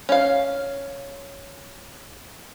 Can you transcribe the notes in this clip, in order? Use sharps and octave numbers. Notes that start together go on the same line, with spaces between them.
C#4 F5